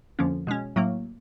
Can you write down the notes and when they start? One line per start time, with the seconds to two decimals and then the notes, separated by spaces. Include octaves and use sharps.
0.19 F2 D3 F3 A#3 C#4
0.47 B2 G#3 C#4
0.76 A2 F#3 A#3